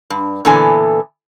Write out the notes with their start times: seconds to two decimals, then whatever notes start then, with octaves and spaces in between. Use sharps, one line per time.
0.10 G2
0.45 A#2 D3 E3 B3 A4 G#5